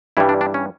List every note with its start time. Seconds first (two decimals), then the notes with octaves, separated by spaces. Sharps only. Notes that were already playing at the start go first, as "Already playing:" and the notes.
0.17 G2 E3 G3 E4
0.29 D4
0.41 D4
0.54 C#4